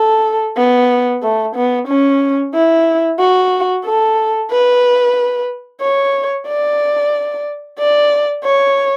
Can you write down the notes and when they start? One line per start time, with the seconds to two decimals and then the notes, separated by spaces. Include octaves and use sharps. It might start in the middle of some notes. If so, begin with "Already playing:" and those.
Already playing: A4
0.57 B3
1.23 A3
1.56 B3
1.88 C#4
2.54 E4
3.19 F#4
3.85 A4
4.51 B4
5.81 C#5
6.48 D5
7.79 D5
8.44 C#5